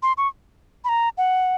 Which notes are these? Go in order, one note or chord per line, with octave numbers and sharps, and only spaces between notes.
C6
C#6
B5
A#5
F#5